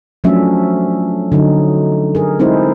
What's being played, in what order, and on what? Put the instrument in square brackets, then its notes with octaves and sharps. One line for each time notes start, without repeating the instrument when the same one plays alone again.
[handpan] F3 F#3 A3 C#4 D4 E5
D3 F#3 D#4
G#4 A#4
G#3 C4 D#4 E4 C5